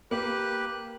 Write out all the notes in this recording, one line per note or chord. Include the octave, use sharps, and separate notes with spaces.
A#3 G4 B4 F#6